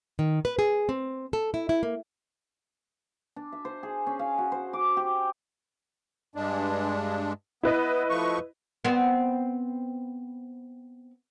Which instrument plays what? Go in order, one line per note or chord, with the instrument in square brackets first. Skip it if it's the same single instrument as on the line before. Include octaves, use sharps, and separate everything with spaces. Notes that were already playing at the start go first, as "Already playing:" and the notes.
[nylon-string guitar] D#3
B4
G#4
C4
A4
E4
E4
A#3
[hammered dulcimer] D4
E5
C5
G#4
C#4
F5
F#4
C5
D6
G4
[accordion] G2 G#3 D4
[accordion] B3 [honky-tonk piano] E4 B4 D#5
[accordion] F3 A3 C#6
[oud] B3 C4